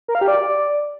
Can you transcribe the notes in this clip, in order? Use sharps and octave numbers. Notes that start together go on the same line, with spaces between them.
A#4
F5
G4
D5